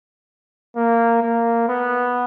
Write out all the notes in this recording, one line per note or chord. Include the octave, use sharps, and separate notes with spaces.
A#3
A#3
B3